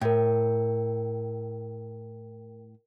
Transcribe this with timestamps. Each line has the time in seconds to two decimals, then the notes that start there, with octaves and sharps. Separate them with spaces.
0.01 A2 A#4 G5